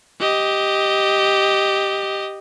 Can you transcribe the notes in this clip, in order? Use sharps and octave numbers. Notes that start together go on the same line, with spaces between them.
G4 D#5